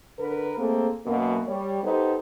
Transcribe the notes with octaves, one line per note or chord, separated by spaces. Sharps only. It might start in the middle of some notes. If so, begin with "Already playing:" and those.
D3 A#4 B4
A3 A#3 C4 G#4 A4
F#2 B2 F#3 A#3
G3 C#5
B3 D#4 G4 A4 C5